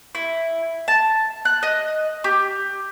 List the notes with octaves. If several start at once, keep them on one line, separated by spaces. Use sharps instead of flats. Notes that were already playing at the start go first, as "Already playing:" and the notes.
E4
A5
F#6
D#5
G4